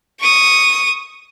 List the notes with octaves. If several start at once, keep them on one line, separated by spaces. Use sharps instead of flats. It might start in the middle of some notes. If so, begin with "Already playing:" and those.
C#6 D#6